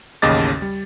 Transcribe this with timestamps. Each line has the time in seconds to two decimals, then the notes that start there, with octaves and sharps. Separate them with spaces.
0.22 A1 D#2 C#3 D#5 D6 A6
0.62 G3